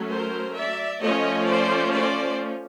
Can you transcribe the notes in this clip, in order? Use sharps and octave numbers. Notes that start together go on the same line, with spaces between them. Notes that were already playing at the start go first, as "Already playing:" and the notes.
Already playing: F#3 A3 C#4
A#4 C5
D5 E5
F3 A3 C#4 C#5 D#5
C5 D5
C5 D5